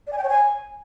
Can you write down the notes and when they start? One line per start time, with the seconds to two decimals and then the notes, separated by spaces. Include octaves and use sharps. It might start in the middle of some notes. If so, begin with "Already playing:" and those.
0.07 D5
0.13 G#5
0.18 G5
0.24 C#5
0.29 G#5